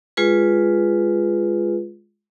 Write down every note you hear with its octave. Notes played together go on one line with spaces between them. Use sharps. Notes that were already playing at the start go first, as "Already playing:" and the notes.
G#3 F4 G#4 B4